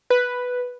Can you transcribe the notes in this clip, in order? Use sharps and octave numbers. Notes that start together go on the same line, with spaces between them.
B4